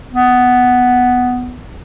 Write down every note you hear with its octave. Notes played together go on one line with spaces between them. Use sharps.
B3